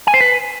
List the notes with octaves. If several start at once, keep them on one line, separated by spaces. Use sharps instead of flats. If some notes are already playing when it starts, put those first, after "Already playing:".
G#5
C5
B4